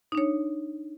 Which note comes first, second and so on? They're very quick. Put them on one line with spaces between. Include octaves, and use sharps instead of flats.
D#4 D4 C#5